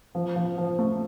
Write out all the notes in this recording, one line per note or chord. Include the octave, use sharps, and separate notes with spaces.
F3
F3
F3
A3